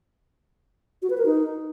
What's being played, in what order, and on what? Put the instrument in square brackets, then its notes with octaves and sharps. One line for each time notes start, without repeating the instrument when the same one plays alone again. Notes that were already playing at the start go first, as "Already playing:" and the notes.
[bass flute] F#4
B4
A#4
D#4